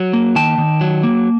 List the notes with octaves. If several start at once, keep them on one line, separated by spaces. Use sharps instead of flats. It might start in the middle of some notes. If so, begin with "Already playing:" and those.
Already playing: F#3
A#3
D#3 G5 A5
D#3
F#3
A#3